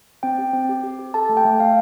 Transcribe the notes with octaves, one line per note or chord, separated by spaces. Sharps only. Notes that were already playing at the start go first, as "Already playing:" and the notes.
C4 G5
G4
C4
G4
G4
G4
A4 A5
A3
G5
A3
A3 F5